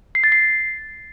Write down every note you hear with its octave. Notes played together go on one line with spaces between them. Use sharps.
C7
A6
C7